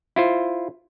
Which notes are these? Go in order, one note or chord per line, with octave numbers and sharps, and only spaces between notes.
E4 F4 C5